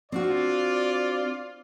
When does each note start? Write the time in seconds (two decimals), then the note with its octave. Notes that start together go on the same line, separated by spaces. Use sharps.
0.12 C4 D4 F4 F#4 D5